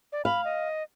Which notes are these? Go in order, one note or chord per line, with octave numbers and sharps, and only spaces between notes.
D5
F5 B5
D#5